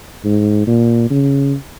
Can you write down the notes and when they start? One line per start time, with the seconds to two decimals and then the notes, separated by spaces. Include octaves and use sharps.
0.24 G#2
0.67 A#2
1.10 C#3